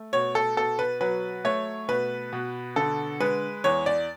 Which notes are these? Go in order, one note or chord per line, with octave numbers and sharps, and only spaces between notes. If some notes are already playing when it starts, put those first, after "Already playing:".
Already playing: A3
B2 C#5
A4
B2 A4
B4
F#3 B4
A3 C#5
B2 B4
B2
D3 A4
G#3 B4
E2 C#5
D5